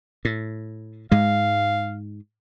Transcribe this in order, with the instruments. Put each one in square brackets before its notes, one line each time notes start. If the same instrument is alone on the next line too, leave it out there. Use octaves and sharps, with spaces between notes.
[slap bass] A2
[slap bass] G#2 G#3 [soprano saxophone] F5